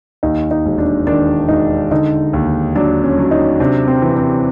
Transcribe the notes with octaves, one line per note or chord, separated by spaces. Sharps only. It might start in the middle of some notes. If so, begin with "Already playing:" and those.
D#2 D#4
D#4
E1
D4
D#3 D4
E1 D#4
D3 D#4
D#2
F#3 D4
C#4
F#3
D#4
C3 D4
C4
E3
C4